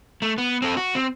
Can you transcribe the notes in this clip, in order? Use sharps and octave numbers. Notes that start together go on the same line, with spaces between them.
A3
B3
C4 A4
F#4
C4